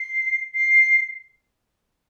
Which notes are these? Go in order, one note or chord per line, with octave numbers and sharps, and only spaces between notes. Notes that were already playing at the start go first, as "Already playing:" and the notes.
Already playing: C7
C7